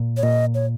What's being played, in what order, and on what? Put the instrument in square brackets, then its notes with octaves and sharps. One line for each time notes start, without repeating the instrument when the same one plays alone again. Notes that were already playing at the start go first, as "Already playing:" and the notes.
Already playing: [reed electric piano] A#2
[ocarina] C#5
[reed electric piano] A#2 [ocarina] D#5
[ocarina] C#5